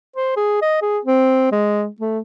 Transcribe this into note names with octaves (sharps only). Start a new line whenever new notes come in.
C5
G#4
D#5
G#4
C4
G#3
A3